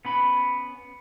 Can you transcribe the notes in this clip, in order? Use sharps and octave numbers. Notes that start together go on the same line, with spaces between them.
B3 C#4 B5